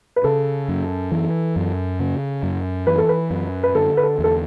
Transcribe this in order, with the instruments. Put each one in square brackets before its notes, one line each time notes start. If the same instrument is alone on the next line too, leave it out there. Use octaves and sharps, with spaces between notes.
[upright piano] B4
[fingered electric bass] C#3 [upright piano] A4
[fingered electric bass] F#2
E3
F#2
C#3
F#2
[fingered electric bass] E3 [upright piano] B4
[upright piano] A4
B4
[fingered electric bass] F#2
[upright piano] B4
[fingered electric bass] D3 [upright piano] A4
[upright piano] B4
A4
[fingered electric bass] E2
[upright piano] A4